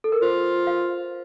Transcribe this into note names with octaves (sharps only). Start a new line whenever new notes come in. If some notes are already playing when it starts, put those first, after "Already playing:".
A4
A#4
F4 C5
F5